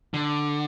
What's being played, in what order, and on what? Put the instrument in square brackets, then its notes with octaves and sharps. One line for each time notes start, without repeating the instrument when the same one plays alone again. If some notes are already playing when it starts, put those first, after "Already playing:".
[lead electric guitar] D3